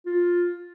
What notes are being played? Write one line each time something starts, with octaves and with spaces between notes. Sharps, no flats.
F4